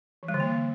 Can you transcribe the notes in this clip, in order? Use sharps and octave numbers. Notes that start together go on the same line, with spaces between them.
E3
G3
D3
A#3